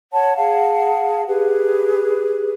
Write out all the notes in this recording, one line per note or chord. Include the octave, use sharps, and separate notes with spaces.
C#5 F#5 A5
G#4 F5 F#5 A5
G4 G#4 B4